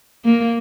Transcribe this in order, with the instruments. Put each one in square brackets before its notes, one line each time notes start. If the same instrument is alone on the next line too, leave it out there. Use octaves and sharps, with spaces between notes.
[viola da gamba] A#3